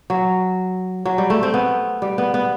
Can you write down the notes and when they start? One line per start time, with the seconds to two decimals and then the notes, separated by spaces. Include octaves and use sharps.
0.10 F#3
1.05 F#3
1.18 G3
1.30 A3
1.43 C4
1.54 B3
2.02 G3
2.18 B3
2.34 B3